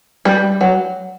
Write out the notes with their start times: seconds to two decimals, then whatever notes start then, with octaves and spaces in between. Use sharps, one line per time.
0.25 G3
0.61 F#3